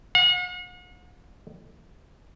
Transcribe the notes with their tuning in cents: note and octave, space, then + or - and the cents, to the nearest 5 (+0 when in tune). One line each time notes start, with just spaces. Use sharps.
F#5 -45